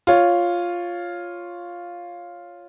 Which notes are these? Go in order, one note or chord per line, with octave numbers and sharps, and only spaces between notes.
F4 C#5